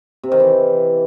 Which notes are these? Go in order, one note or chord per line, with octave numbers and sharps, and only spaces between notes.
C3
D#3
E3